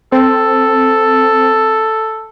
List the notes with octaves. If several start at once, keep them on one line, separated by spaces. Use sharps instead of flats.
C4 A4